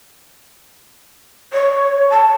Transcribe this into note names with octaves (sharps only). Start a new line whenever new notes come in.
C#5
A5